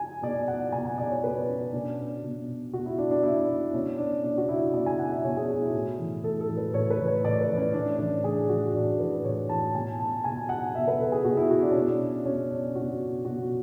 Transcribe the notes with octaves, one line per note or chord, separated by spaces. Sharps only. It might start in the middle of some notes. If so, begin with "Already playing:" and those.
Already playing: G#5
B2 D5
F#5
B2 G#5
G#5
D5
C#5
B2 B4
C#4
B2 D4
B2
B2 F#4
E4
D4
D4
B2 E4
D4
B2 C#4
D4
B2 D4
F#4
E4
B2 D5
G#5
F#5
E5
B2 C#5
G#4
F#4
E4
A2 E4
E3
A2 A4
A4
E3
B4
A2 C#5
B4
E3
C#5
A2 D5
B4
E3
C#4
A2 D4
E3 D4
A2 G#4
E3 F#4
A2 D4
E3 B4
A2 C#5
E3 A5
B2 G#5
A5
B2 G#5
F#5
B2 E5
B4
A4
G#4
B2 F#4
E4
F#4
D4
B2 C#4
D4
B2 C#4
D4
B2 F#4
B2 F#4